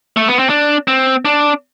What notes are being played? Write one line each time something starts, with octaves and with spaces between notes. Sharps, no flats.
A3
B3
C4
D4
C4
D4